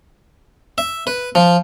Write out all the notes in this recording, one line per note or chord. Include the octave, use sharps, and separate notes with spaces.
E5
B4
F3